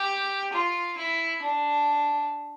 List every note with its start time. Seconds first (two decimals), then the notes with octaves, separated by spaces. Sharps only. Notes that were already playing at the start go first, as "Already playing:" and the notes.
Already playing: G4
0.52 F4
0.96 E4
1.41 D4